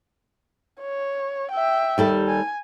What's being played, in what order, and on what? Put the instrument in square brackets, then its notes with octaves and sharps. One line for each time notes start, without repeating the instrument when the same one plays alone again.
[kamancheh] C#5
E5 G5
[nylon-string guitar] D#2 G3 A4
[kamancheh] G#5